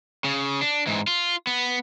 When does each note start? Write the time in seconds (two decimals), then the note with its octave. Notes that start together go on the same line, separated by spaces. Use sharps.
0.24 C#3
0.61 D4
0.87 G#2 E3
1.07 F4
1.47 B3